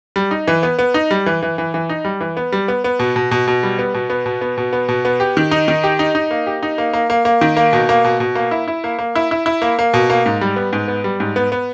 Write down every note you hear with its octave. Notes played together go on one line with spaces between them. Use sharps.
G3
D#4
E3
B3
B3
D#4
G3
E3
E3
E3
E3
D#4
G3
E3
B3
G3
B3
B3
B2
B2
B2
B2
G3
B3
B2
B3
B2
B3
B2
B3
B2
B3
G4
D#3
D#4
D#3
G4
D#4
D#4
A#3
G4
D#4
A#3
A#3
A#3
A#3
D#3
A#3
B2
A#3
B2
B2
A#3
E4
E4
A#3
A#3
E4
E4
E4
A#3
A#3
B2
A#3
G#2
G3
B3
G#2
B3
G3
G#2
B3
B3